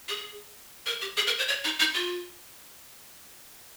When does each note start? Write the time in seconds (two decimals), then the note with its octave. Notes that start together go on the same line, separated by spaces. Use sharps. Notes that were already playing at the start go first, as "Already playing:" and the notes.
0.08 G#4
0.86 A#4
1.01 G4
1.17 G#4
1.27 A#4
1.39 C5
1.48 C#5
1.64 D#4
1.80 D#4
1.94 F4